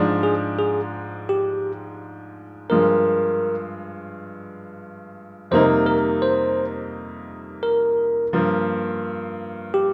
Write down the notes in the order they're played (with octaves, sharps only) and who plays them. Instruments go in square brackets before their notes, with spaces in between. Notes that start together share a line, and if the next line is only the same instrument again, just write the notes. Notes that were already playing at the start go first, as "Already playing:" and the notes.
Already playing: [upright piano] G#2 F3 G#3 D4
[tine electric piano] G#4
G#4
G4
[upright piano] G2 F3 G#3 [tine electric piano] A#4
[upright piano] F2 C3 G3 A#3 D#4 [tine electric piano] C5
[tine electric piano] A#4
C5
A#4
[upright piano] G2 F3 A#3
[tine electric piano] G4